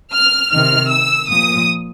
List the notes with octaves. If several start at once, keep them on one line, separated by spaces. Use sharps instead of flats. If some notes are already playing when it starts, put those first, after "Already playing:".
F6
C3 D#3 F6
E6
A#2 F3 D#6